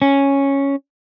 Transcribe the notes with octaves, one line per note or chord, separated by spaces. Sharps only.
C#4